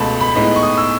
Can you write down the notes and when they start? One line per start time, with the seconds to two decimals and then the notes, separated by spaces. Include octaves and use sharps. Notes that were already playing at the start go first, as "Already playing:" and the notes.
Already playing: C#2 B2 A3 A5 B5
0.21 B5
0.35 A2 G#3 B3 D#4
0.56 C#6
0.63 D#6
0.77 E6